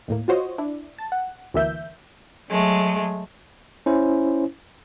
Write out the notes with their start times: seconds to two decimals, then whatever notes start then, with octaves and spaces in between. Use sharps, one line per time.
0.08 D#2 A2 A#3
0.28 F4 F#4 C5 C#5 D#5
0.58 D4 E4
0.98 A5
1.12 F#5
1.54 G1 D2 E3 A#3 E5 G6
2.49 F#3 G#3 A3
3.86 C#4 E4 C5